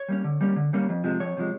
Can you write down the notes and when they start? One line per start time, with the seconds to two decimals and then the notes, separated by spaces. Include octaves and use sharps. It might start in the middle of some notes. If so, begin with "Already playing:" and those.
Already playing: C#5
0.09 G3 A#3 C#4
0.24 D3
0.41 G3 A#3 C#4
0.56 D3
0.73 G3 A#3 C#4
0.89 F2
1.04 C3 F3 G#3
1.20 F2 C#5
1.37 C3 F3 G#3